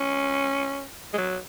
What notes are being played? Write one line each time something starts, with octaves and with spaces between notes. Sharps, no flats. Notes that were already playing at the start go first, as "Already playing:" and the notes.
Already playing: C#4
G#3
F#3